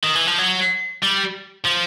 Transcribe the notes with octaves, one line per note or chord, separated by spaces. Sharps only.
D#3
E3
F3
F#3
G3
F3